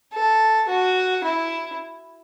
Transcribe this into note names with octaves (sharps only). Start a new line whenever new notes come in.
A4
F#4
E4